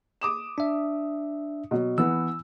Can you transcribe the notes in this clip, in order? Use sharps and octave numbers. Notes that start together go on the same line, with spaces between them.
D6 D#6 E7
D4 E5
B2 F#3
E3 B3 E6